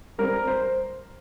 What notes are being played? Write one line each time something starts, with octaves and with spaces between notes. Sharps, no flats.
G3 C4 A#4
C5